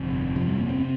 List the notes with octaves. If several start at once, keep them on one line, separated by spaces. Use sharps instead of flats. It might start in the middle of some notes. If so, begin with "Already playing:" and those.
Already playing: G1 F2 C3
G1 F2 C3 F3
G3
A#3
C4
C3 C4